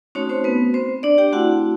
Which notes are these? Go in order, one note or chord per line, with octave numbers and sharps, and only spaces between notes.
A3 C4 C#4 D#4 F#4 C#5
C4 C5
B3 B4
C4 C5
D4 D5
G4 G5
A3 C4 E4 F#4 F#5